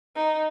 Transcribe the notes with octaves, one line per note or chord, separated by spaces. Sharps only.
D#4